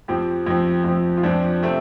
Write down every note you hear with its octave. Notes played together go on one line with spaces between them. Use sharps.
F2 F3 C4 G4
F2 F3 C4
F2 F3 C4
F4
F2 F3 C4 D4
C3 A3 C4